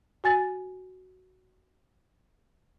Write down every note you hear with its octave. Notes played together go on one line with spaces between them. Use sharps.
F#4 G#5 A6